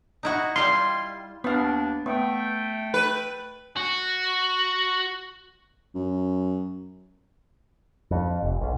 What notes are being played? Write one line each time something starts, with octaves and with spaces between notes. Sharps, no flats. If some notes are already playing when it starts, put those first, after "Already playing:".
D#4 E4 F#4
G3 E4 F4 C6
D#2 B3 D4 F5
A3 B3 G5
B4
F#4
F#2
F2
F1
B1